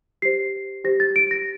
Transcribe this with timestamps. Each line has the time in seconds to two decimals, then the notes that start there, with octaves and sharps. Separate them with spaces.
0.22 G4 C5 C7
0.84 G4 C5 A#6
1.00 A6
1.16 D7
1.31 A#6